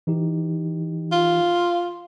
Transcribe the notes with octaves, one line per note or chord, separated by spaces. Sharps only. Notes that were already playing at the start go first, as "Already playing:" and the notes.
E3 D#4 G4
F4